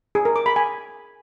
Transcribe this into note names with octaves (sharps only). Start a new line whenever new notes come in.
G#4
A#4
D6
B5
G#5